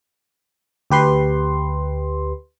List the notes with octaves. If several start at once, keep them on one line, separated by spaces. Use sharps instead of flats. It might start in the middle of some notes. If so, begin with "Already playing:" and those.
D2 G4 B4 C6